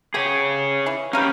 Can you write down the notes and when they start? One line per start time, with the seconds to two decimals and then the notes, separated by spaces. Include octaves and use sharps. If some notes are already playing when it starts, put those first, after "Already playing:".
0.14 B2 G4 G#4 C#5
0.86 E3 G#4
1.13 A#3 C#4 G4 A#4 B4